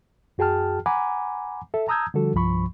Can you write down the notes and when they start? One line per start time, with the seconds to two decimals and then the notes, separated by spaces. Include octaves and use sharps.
0.38 F#2 F#4 G#4 G5 A5 F6
0.86 F#5 G#5 A#5 B5 D6
1.74 A4 E5
1.88 A5 A#5 D#6 E6 G6 G#6
2.14 D3 F3 G3 F#4 A4
2.34 C2 G2 F3 B5 C#6